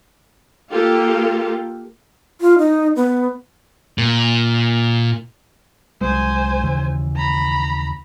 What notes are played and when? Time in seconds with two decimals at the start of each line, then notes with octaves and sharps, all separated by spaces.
0.71 A#3 F4 G4 A4
2.41 F4
2.58 D#4
2.96 B3
3.98 A#2
6.01 C2 F#3 G#3 C5 G#5
6.63 D#2 C#3 E3
7.16 A#5 B5